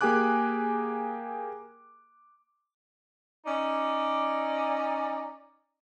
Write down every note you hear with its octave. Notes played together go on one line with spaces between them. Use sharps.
A#3 G4 G#4 G#5 D6 F#6
C#4 D#4 D5